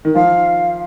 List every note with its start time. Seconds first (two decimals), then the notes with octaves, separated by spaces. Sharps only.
0.05 D#3
0.15 F3 F5